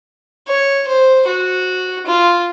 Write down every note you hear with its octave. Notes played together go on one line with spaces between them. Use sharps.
C#5
C5
F#4
F4